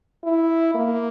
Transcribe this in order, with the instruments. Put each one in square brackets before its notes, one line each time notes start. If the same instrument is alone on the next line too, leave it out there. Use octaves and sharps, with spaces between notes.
[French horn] E4
A#3